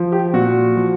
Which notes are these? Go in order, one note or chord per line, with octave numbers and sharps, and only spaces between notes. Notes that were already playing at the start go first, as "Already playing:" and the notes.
Already playing: F3
G4
A#2 F#4
F3